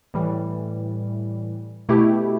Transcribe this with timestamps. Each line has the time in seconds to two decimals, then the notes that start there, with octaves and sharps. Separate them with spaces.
0.14 A2 E3 G3
1.89 B2 A3 E4 G4